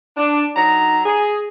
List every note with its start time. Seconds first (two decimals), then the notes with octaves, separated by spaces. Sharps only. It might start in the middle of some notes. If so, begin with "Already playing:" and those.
0.17 D4
0.56 F#3 D#4 A#5
1.06 G#4